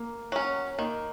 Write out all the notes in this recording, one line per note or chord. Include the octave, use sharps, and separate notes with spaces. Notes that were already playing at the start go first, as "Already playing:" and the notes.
Already playing: A#3
F#3 C#4
D#3 A#3